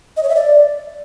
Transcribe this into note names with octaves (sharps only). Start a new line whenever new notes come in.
D#5
C#5
E5
D5